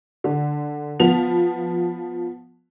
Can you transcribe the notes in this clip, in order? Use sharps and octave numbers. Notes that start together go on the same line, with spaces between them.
D3
F3 B3 F7